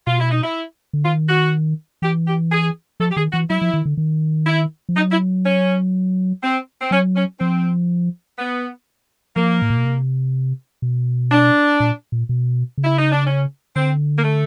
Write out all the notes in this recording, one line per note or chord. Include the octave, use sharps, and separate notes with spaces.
B2 F4
E4
D#4
E4
D3
D#3 F4
F#4
E3 G4
G4
G#4
F3 A4
G4
D#3 G#4
E3 F#4
F#3 E4
F3
D#3
D3
D#3
E4
F3
F#3 D#4
E4
C#4
C4
C4
F#3 C#4
C#4
F3 C4
B3
F3 A#3
A2
A#2
B2
C3
B2
D4
A#2
A#2
B2
C#3
E4
D#4
D4
C#4
D3 C4
A#3
A3